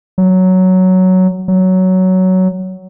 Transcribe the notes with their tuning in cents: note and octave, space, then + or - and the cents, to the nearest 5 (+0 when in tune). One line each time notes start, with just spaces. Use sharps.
F#3 +5
F#3 +10